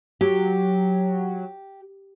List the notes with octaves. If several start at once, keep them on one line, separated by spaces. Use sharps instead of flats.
F#3 G4